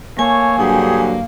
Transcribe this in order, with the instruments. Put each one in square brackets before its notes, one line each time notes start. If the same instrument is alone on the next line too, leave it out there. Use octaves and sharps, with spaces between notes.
[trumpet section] A3 C#5 [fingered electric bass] A#3 [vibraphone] G#5
[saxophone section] G2 D3 F#3 [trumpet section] G4 G#4